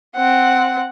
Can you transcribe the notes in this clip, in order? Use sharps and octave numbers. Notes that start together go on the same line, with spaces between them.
C4 F#5